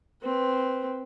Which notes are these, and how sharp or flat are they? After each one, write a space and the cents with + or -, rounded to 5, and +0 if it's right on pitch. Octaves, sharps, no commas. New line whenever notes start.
C4 +0 B4 +0